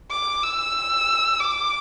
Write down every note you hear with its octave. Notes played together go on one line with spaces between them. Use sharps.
D6
E6
D6